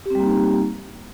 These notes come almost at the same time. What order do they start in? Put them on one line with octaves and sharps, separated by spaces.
G4 C4 G3 A#3 D#4